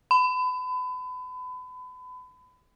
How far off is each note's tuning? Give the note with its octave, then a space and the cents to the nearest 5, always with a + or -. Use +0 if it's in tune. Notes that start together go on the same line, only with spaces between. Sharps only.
B5 +35